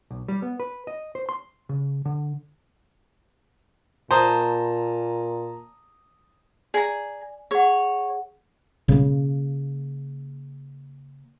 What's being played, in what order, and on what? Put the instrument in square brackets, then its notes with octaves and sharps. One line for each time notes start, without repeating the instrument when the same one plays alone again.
[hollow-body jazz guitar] B1
G3
B3
B4
D#5
C5
C6
C#3
D3
[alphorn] A#2 [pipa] C5 [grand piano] A5 A#5 D#6
[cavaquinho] G#4 A#5 [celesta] D5 G#5
[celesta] G#4 F#5 [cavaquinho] C#5
[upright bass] C#3 A#3